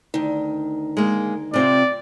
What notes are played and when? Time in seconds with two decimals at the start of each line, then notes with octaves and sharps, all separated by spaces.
0.14 D2 D#3
0.97 G#3 A#3
1.54 C3 C4 F4 D5